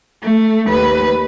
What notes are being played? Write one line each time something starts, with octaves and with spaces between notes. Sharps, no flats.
A3
D#2 B4